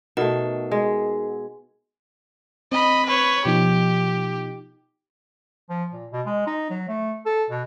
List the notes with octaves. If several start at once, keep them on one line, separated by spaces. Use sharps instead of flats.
B2 A3 D#4 A#4 F#5
G#3
C4 D#5 B5
B4 C#5
B2 F3 D#4 G4
F3
A#2
B2
G#3
D#4
F#3
A3
A4
B2